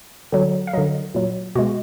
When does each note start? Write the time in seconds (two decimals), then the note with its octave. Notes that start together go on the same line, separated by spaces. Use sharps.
0.32 D3 F#3
0.67 F5
0.73 D3 F#3 D#5
1.14 A#2 F#3
1.55 B2 G#3 F#4